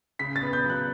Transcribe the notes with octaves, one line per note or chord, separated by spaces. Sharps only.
C#3 B6
A6
B3
G6
F#3
F#6